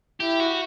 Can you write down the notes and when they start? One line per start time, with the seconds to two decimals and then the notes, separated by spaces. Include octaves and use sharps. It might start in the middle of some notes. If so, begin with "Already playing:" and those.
0.20 E4 G4
0.40 F#4